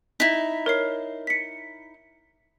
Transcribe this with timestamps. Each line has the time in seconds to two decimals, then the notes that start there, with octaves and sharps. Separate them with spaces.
0.20 D#4 E4 B6
0.66 A#4 C#5 C7
1.27 B6 C#7